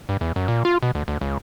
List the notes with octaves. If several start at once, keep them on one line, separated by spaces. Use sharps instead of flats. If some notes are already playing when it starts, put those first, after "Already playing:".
G2
E2
F#2
A#2
F4
B2
D2
D2
C#2